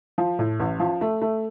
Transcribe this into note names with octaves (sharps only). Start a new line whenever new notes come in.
F3
A2
A1
F3
A3
A3